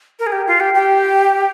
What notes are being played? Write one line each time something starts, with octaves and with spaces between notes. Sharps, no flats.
A#4
G#4
G4
F4
G4
G4